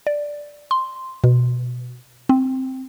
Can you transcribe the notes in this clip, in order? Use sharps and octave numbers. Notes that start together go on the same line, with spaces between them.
D5
C6
B2
C4